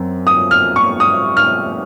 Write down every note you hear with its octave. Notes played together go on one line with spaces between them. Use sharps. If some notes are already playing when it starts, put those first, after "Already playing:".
Already playing: F#2 C4
D#6
F6
C#6
D#6
F6